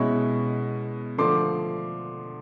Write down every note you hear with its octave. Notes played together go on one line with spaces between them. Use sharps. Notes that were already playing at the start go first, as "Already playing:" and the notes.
Already playing: B2 G#3 C#4 E4 B5 C#6
D3 F3 A3 C6 D6